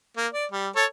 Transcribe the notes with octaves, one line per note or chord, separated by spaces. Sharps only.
A#3
D5
G3
A4 C#5 A5